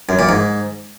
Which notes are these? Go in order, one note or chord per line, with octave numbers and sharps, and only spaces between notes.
F#2
A#2
G#2